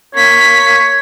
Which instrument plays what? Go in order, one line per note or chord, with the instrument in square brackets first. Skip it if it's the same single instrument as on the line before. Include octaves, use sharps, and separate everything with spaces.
[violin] A#3 B6 [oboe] C#5